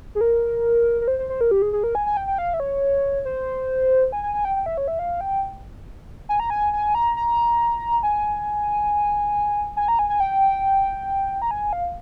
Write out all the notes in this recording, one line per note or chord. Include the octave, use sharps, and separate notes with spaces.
G#4
A#4
A#4
C5
C5
C5
A#4
G4
G#4
G#4
A#4
G#5
G#5
G5
G5
F5
E5
C#5
C5
G#5
G#5
G#5
G5
G5
E5
C#5
E5
F5
G5
G#5
A#5
G#5
G#5
A#5
A#5
G#5
G#5
A#5
G#5
G#5
G5
A#5
G#5
F5